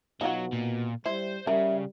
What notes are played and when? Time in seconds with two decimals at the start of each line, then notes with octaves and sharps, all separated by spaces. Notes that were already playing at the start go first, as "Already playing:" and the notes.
0.21 B2 F#3 D#4 F4 F#4
0.53 A#2
1.06 G3 E4 C5
1.47 C#3 G3 A#4 E5